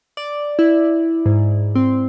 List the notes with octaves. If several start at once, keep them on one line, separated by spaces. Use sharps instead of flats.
D5
E4
G#2
C4